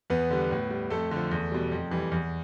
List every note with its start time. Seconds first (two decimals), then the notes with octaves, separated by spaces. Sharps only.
0.10 E2 B3 B4
0.31 D3 G3
0.51 A2
0.70 G3
0.90 F2 A3 A4
1.11 D3 F3
1.31 E2
1.52 B2 G3
1.72 F2
1.91 E3 G3
2.12 E2